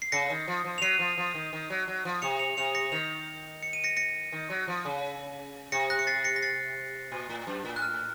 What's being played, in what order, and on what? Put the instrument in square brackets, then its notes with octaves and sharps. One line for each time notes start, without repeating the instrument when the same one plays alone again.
[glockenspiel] C7
[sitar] C#3 [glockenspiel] A#6 C#7
[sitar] D#3
F3
F3
[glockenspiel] F7
[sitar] F#3 [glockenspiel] C7 D#7
[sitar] F3
F3
D#3
D#3
F#3
F#3
F3
[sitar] C3 [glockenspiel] C#7 F7
[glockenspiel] C#7 F7
[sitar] C3 [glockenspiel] C#7 F7
[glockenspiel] A#6 C#7
[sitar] D#3 [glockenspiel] C#7 F7
[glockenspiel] C#7
D#7
A#6 C#7
A#6 C#7
[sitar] D#3
F#3
F3
C#3
[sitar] C3 [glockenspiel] A#6 C#7
[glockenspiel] F#6 A#6
C#7
A6 C7
A#6 C#7
A#6
A6 C7
[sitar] A#2
A2
F#2
A2
[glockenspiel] F#6
F6